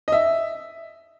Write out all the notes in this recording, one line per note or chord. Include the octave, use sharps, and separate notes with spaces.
D#5
E5